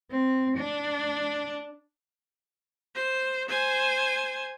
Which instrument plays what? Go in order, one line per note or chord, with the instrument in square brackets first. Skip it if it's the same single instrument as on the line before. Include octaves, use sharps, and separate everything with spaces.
[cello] C4
D4
[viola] C5
C5 G#5